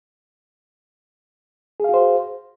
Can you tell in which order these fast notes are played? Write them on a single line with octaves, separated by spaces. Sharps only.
G#4 F5 F#4 C5